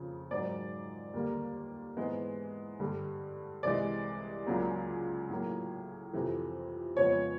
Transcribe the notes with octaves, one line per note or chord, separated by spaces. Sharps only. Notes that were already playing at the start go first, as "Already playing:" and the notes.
Already playing: F2 C#3 F3 A#3
G#2 D#3 F#3 D5
D#2 D3 G3 A#3
G#2 E3 G#3 B3
G2 D3 G3
C2 C3 E3 G#3 D5
C#2 C#3 F#3 A#3
A2 F#3 A#3
F2 C3 E3 A3
F2 C#3 F3 G#3 B3 C#5